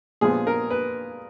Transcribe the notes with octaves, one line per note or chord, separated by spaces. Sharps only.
A#2 F3 G#3 B3 G#4
A#4
B4